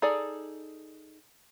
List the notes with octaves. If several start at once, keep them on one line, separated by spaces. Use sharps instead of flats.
D#4 G#4 A4 D5